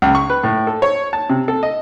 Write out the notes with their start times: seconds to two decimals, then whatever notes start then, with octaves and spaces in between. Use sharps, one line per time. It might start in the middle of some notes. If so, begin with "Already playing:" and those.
0.02 C#2
0.15 C#6
0.30 B4
0.43 A2
0.67 A4
0.82 C#5
1.13 A5
1.29 C3
1.48 A4
1.63 D#5